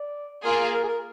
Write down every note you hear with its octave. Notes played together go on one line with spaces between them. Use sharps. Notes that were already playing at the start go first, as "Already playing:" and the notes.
Already playing: D5
A#3 F4 G#4 A#4
A#4
G#4
A#4